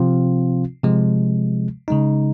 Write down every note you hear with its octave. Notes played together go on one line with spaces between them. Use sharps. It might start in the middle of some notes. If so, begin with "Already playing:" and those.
Already playing: C3 F3 C4 F4
C3 F3 G#3
C#3 G#3 D#4